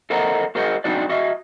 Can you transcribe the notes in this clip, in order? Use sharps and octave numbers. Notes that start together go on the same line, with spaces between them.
A4 A#4 C5 D#5 F#5 A#5
F#4 G#4 A#4 C5 D#5 F#5
C4 D4 D#4 F#4 B4 D5
F#4 D#5 E5